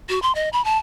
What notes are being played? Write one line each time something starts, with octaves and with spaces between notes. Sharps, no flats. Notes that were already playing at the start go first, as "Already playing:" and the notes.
F#4
C6
D#5
B5
A5